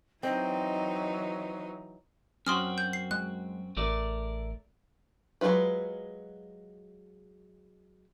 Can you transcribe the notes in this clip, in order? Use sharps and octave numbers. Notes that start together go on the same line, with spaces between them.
E3 F#3 C4 D#4 D#5
F#2 C4 C#4 F#4 C6 D#6 F6
G6
C7
G#3 F#6
A1 A3 A#4 D5
F#3 G#3 D#4 F4 B4